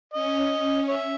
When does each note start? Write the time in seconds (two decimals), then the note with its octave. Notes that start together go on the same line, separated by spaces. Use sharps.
0.14 C#4 D#5
0.52 C#4
0.88 C#5 E5